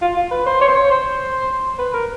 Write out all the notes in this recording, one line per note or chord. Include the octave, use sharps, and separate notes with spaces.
F4
F4
B4
C5
C#5
C5
C#5
C5
B4
A#4